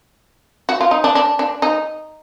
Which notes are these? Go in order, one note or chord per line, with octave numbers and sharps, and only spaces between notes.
F#4
F4
D#4
D4
D4
D4
D#4